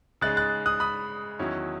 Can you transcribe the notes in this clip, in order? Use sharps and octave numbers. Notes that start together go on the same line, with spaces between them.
C#3 G#3 D#4 F#6 A6
F#6 A6
D#6 F#6
B5 D#6
E2 D#3 F#3 C#4 E4